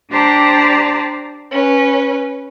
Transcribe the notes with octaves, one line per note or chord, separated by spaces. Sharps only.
D4 G4 C5 D5 A5 A#5
C#4 B4